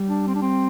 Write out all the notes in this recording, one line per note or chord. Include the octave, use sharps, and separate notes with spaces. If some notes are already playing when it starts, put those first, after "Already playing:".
Already playing: G3
D4
C4
D4
C4